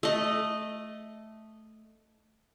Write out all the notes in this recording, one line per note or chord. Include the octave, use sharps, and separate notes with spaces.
A3 D#5